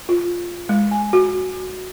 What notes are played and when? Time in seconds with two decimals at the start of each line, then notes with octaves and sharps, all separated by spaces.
0.09 F4
0.69 G#3
0.91 G#5
1.13 F#4